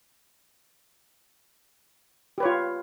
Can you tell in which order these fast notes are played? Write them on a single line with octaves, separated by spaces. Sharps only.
G4 B4 C#5 F4